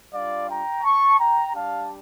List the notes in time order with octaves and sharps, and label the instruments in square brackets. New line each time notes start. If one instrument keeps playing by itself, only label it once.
[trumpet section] G3 D4 F4 D5 F5
G5 A#5
A5 C#6
G5 A#5
G3 D4 G4 F5 A5